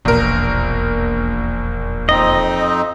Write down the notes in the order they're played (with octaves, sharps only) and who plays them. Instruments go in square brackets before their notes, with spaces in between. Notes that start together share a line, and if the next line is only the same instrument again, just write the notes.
[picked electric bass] D#1 E2 B2 [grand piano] A#1 A#4
[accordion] F2 C4 D#4 [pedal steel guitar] D#5